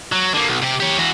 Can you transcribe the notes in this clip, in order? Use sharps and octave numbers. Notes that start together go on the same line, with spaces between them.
F#3
D3 A#3
B1
C3 G4
G4 C#5
E3 F#4